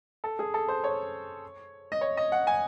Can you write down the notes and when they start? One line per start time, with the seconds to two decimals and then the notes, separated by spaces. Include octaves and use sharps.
0.24 A4
0.39 G#4
0.54 A4
0.68 C5
0.84 C#5
1.92 D#5
2.01 C#5
2.17 D#5
2.32 F#5
2.47 G#5